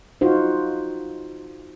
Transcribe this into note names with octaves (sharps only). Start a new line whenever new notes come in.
D#4 F4 F#4 C5